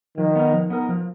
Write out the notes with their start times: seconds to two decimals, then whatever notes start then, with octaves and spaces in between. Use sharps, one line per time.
0.17 D#3 F3
0.36 B3 D#4 A#4
0.53 F3
0.70 B3 D#4 A#4
0.89 F3